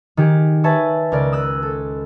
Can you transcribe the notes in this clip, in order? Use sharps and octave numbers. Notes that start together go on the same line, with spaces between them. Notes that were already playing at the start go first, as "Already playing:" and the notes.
D#3 G4 G#4
B4 C#5 E5 G#5 A5 C#6
C#2 A#4 D5
D#6 E6 F#6
A4